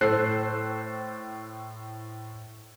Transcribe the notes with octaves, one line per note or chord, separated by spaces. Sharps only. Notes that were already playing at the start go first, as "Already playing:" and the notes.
A2 A4 C5 F#6 C7